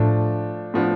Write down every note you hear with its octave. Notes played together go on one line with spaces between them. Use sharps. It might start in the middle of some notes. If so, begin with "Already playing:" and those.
Already playing: A2 F3 A3 D4
A2 F3 B3 D4